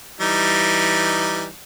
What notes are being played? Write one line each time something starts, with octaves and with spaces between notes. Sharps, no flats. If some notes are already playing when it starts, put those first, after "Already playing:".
E3 G3 D#4